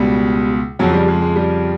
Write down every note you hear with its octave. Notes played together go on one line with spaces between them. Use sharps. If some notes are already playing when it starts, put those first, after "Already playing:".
Already playing: C#2 B2 G3
F2 C#3 F3 F#3
G3
G#3
G#3
G3